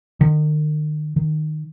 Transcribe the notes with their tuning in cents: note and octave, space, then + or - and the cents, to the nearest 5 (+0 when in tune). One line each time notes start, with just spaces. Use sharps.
D#3 -40
D#3 -15